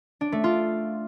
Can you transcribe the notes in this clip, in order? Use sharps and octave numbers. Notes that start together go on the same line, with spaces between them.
D4
A3
F4